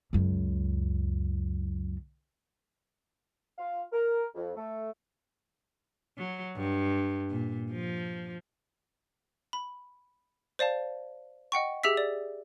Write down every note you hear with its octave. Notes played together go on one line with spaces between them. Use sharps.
C#2 F#2
F4 F5
A#4
F2
A3
F#3
G2
A#2
F3
B5
C5 D5 F5 A5
D#5 F#5 G5 C#6
G4 G#4 E5 E6 B6
D5